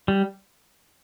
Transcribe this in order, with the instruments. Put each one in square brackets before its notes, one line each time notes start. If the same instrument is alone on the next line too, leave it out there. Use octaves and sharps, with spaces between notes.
[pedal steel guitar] G3